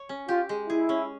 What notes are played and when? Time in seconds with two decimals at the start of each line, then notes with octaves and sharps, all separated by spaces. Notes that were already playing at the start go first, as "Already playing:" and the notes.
Already playing: C#5
0.09 C#4
0.28 F4 G4
0.49 G#3
0.69 E4 G#4
0.89 C#4